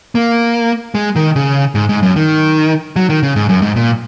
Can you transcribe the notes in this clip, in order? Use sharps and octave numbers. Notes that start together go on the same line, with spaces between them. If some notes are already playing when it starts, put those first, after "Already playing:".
A#3
G#3
D#3
C#3
G#2
G#2
F#2
D#3
F#3
D#3
C#3
G#2
F#2
G#2
A#2